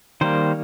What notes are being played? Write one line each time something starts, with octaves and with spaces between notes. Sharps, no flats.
D#3 G3 A#3 C5